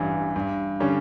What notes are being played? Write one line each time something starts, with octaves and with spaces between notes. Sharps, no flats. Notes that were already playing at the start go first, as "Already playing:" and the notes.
Already playing: A1 G2 E3
G2
D3 G3 C#4